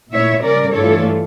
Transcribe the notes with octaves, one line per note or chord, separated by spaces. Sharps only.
A#2 A3 E4 C#5 E5
C#3 G3 C#4 A#4 D5
G2 E3 A3 D4 F4 A4 C#5